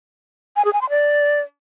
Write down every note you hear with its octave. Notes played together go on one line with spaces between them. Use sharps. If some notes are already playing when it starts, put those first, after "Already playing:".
G#5
G#4
G#5
C6
D5